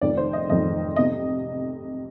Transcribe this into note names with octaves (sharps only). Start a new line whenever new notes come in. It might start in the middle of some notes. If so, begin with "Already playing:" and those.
F1 F2 D#3 D5
C5
D#5
F1 F2 D#3 D#5
C3 D#5